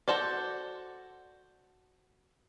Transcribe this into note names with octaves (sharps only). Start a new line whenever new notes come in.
F#4 A4 C5 D5